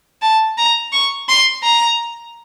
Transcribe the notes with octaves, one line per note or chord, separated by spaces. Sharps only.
A5
A#5
C#6
C6
A#5